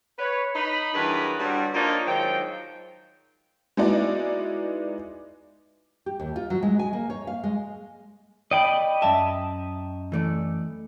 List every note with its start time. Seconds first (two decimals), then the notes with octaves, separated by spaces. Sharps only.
0.18 B4 C#5
0.55 D#4 B5
0.94 G2 E3 F#3 G#4 A#4 B4
1.39 G2 D3 F#3 G3
1.74 A#3 D4 D#4 F4 C5 C#5
2.06 G#2 D#3 F3 F#3 G5
3.77 G#3 B3 D#4 E4 F#4 D5
6.06 G4
6.20 D#2
6.36 F4
6.50 F#3
6.63 G#3
6.79 G#5
6.93 A#3
7.10 C#5
7.27 F5
7.44 G#3
8.51 D5 D#5 G5 B5
9.02 F#2 E5 A5
10.12 E3 A3 D5